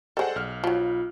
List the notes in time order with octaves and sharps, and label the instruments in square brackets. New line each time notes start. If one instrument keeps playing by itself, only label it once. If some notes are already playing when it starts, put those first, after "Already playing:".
[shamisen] G3 G#3 [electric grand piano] A4 C5 F#5
[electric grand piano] B1 F6
[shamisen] F3 F#3 [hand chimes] F4